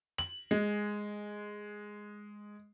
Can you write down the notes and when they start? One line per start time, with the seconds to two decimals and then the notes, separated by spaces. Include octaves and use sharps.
0.18 F#7
0.51 G#3